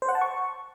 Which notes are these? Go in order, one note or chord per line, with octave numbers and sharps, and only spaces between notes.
C5
F#5
A5
C#6